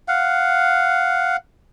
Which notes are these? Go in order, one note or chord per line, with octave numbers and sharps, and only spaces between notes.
F5 F#5